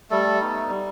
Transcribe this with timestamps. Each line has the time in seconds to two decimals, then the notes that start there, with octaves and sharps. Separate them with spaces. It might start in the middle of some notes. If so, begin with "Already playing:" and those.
0.11 G3 A3 A4
0.41 B3 D#4
0.70 G3